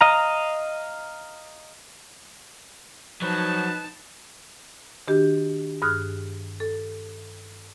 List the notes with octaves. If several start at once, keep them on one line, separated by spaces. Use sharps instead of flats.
D#5 F5 A#5
F3 F#3 D#4 B4 A5
D#3 D4 F#4 G4
G2 G#4 D#6 F6 F#6
A4